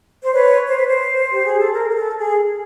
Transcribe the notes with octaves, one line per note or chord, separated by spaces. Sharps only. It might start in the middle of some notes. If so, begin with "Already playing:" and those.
C5
B4 C#5
C5
B4
C5
G4
G#4
A4
A#4
A#4
A4
G#4